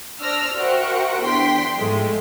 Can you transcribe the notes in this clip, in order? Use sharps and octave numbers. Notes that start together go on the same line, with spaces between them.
D4 C5 D5 E6 F6 A#6
F#4 A#4 C5 E5 F#5 G5
E2 D4 G5 C6 B6
G#2 F3 G#3 A3